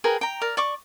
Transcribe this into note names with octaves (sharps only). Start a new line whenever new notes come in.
G#4 A#4 B4 G5
G5 A#5
A#4 D5
D5 C#6 D6